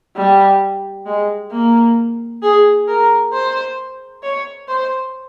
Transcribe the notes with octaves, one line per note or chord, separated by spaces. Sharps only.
G3
G#3
A#3
G#4
A#4
C5
C#5
C5